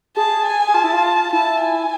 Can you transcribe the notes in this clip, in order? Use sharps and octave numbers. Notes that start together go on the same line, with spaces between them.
G#4 A5
G#5
G#4
F4 A5
E4
F4
E4 A5
G#5